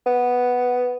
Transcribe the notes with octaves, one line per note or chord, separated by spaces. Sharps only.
B3